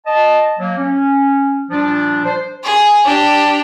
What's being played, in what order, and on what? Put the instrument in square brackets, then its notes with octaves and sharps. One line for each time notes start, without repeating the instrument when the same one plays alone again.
[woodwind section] D#5 A5
F#3 A#3
C#4
A#2 F3 G3 D4
C5
[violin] G#4
D4 G4